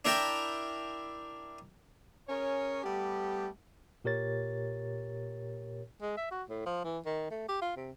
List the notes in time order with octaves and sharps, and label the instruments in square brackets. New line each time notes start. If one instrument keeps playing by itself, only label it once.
[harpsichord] D4 E4 A#4 E5 G5 A5
[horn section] C#4 G#4 A#4 C#5
G3 A3 B3 G4
[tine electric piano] A#2 G4 A#4 C#5 A6
[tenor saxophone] G#3
E5
F#4
A2
F3
E3
D#3
A3
G4
F4
C3